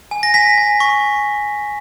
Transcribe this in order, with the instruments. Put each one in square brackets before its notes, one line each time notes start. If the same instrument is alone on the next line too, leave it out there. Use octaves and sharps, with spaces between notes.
[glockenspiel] G#5
A#6
G#5 B6
G#5
C#6